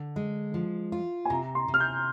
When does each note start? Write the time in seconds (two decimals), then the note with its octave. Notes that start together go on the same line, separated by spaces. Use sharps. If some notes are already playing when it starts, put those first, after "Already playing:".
Already playing: D3
0.16 G#3
0.54 F3
0.92 F4
1.25 G#5
1.30 C3 A#5
1.55 C6
1.68 C3
1.74 F6
1.80 G6